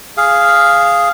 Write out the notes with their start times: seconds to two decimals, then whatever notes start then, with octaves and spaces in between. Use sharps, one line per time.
0.17 G#4 F5